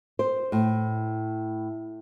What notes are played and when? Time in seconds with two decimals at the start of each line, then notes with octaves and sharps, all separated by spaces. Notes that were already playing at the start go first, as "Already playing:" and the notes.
0.19 C5
0.52 A2